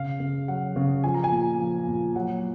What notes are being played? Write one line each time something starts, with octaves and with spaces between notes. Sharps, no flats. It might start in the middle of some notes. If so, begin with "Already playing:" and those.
Already playing: C#3 F5
C#3
F#3 F#5
C#3
F3 G#5
A#5
G#5
A#2
F3
A#2
F#3 F#5